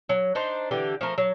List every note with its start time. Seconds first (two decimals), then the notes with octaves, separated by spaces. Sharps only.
0.09 F#3
0.35 D4 D#4 C5
0.71 D3 E3 G4
1.01 F3 A3 A#4
1.18 F#3